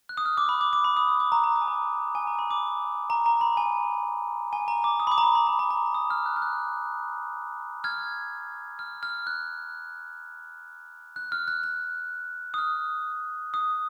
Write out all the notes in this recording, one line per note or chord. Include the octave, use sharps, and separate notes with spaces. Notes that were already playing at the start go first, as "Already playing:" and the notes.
F#6
D#6
F6
D6
B5
D6
D6
B5
D#6
D#6
D6
A#5
A#5
D6
G#5
A#5
G#5
A#5
B5
D6
A#5
A#5
B5
G#5
G#5
A#5
D6
D#6
B5
D6
A#5
B5
B5
A#5
A#5
A#5
D#6
F6
F#6
F6
F#6
F6 G#6
F6
F6
F#6
F#6
F6
F#6
F#6
D#6
F6
D#6